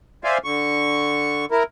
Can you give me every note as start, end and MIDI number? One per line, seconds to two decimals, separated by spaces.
0.24 0.38 72
0.24 0.38 74
0.24 0.38 76
0.24 0.38 77
0.24 0.38 80
0.44 1.45 50
0.44 1.45 85
1.51 1.63 64
1.51 1.63 70